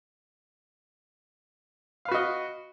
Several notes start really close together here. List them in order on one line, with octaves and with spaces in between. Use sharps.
F5 B4 F#4 D#5